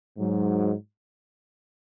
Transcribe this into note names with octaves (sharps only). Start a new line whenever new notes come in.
G#2 F#3